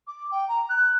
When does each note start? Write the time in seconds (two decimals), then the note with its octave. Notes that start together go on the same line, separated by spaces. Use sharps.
0.07 D6
0.31 G5
0.48 A#5
0.69 F#6